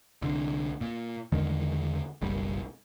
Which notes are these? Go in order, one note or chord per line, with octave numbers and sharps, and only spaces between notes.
C2 D3
A#2
E2 D3 D#3 G#3
F#1 B1 G3